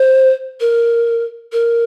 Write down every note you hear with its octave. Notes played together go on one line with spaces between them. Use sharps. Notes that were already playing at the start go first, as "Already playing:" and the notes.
Already playing: C5
A#4
A#4